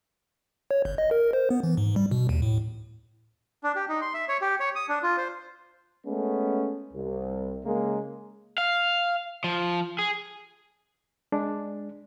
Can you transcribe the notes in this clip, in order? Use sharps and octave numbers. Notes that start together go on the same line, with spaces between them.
C#5
G1
D#5
A#4
C5
B3
E3
G#2
G3
B2
D#2
A2
D4
G4
D#4
C6
E5
C#5
G4
C#5
D#6
D4
F4
C5
G#3 A3 B3 C#4
C2
C#3 G#3 A#3
F5
F3
G#4
G#3 D4